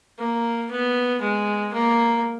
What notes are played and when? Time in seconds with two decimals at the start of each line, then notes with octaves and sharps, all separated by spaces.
0.19 A#3
0.71 B3
1.22 G#3
1.73 A#3